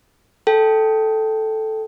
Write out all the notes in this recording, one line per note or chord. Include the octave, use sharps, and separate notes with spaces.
A4 G5